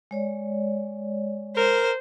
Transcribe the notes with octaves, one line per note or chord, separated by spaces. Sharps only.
G#3 C#5 D5
A#4 C5